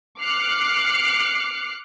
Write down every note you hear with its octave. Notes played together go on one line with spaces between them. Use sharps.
D6 F6 F#6 C7 C#7